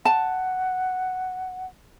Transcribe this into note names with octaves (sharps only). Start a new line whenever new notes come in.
F#5 A5